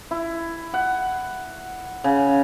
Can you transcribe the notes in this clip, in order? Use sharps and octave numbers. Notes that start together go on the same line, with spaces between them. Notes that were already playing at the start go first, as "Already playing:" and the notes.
E4
F#5
C#3